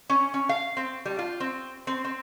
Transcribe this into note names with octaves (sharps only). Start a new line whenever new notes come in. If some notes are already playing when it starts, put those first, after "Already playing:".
C#4
C#4
F5
C4
G3
F4
C4
C4
C4